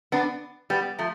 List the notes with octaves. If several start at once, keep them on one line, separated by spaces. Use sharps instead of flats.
B3 D4
G3 B3
F3 A3